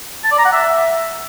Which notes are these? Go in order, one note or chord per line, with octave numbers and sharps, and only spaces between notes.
A5
D5
A#5
F#5
E5